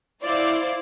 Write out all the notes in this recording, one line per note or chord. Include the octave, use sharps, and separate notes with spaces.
E4 C5 D5 F5